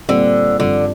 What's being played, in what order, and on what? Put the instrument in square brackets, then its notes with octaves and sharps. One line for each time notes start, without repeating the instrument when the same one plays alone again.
[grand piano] A#2 G3 C4 G4 [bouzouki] D3
[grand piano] G2 F3 C4 F4 [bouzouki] D3